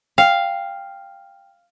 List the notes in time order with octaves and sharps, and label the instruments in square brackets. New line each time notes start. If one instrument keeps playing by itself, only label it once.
[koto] F5 [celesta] G5